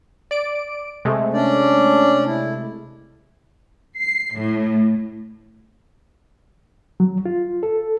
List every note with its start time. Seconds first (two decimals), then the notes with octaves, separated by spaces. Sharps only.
0.31 D5 D7
1.05 C3 G#3 A3
1.34 C#4 D4 D5
2.26 E4
3.99 C7
4.39 A2
7.00 F#3
7.26 F4
7.63 A4